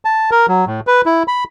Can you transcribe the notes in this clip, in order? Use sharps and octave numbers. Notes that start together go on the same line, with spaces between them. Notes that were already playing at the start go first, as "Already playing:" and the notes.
A5
A#4
F#3
A2
B4
E4
B5